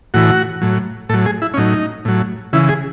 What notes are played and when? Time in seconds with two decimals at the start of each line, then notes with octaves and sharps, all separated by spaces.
0.14 A2 E3 F#4
0.62 A2 F#3
1.09 A2 A4
1.14 F#3
1.26 G#4
1.42 E4
1.54 C#4
1.57 A2 F#3 D#4
2.05 A2 F#3
2.53 C#3 E3 E4
2.69 G#4